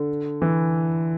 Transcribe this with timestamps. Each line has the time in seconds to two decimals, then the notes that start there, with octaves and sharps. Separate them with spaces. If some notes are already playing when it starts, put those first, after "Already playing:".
Already playing: D3
0.42 E3